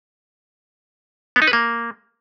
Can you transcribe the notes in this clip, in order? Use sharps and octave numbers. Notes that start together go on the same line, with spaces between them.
B3
D#4
B4
A#3